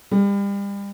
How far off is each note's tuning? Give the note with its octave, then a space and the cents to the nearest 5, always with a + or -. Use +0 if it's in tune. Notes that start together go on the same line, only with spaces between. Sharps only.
G3 +35